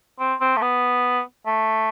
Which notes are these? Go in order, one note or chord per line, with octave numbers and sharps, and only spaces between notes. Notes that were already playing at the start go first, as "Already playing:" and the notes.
C4
C4
A3
B3
A3